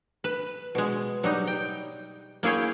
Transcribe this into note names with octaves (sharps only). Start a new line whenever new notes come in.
B4
B2 G#3
F#3 G3 D#4
G5
A#3 E4 G#4 C#5 G5